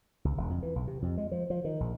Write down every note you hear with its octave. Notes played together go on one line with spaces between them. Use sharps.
C#2
E1
F2
E3
B1
C3
F2
G#3
F3
F3
D#3
A#1